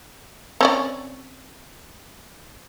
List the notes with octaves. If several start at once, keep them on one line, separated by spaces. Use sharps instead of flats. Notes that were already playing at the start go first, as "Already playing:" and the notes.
C4 C#4 D5